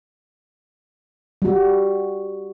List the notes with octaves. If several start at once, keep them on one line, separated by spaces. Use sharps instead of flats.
G3 F#4